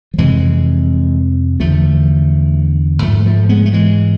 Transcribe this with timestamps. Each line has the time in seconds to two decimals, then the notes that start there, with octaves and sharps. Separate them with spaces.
0.14 F3
0.18 F2 C3 E3 G#3
1.60 E2 D3 F3 A3
3.02 G#2 F3 A3
3.26 F3 A3
3.49 G#3 B3
3.66 A3
3.73 E3 G#3